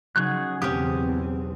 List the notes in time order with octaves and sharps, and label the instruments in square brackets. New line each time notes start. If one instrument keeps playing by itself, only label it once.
[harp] C#3 F#3 D#4 [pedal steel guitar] G#4 C#6 F#6
[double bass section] E2 C4 [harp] B2 [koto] C#4 G4 [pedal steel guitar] D#6